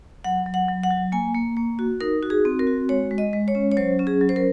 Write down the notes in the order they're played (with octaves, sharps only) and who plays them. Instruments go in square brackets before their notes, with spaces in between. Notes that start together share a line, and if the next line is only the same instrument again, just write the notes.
[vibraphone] F#3 F#5
F#3
F#5
F#3
F#5
F#3
A#3 G#5
A#3
A#3
F#4
D#4 A#4
F#4
G#4
C4
A#4
F#4
G#3 C#5
G#3
D#5
G#3
C#5
C#4
C#5
F#3 C5
C#4
G#4
F#3
C5
A#4